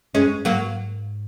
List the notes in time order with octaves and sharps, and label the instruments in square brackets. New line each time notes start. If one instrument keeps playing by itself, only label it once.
[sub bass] F#2 [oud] G#3 C#4
[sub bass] G#2 [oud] F#3 A#3